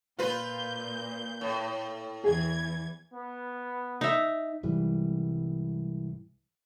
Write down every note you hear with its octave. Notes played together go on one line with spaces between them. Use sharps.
A#2 F4 B4 G6
A2
E2 E3 G#4 G#6
B3
D#4 E5
C2 G#2 E3 G3